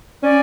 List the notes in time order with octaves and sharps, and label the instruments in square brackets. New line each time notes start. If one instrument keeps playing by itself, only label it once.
[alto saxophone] C#4 [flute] D5